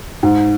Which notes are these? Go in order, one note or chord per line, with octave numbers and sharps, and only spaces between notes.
G#2